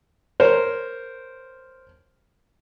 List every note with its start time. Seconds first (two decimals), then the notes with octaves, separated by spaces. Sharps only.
0.40 A#4 C5 C#5